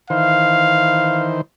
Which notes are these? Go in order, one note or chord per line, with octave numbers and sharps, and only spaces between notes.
D#3 E3 C5 F5